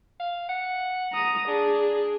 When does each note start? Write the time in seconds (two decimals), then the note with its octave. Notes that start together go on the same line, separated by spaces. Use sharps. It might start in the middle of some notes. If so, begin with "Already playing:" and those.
0.20 F5
0.49 F#5
1.13 A#5 D#6
1.48 D4 G#4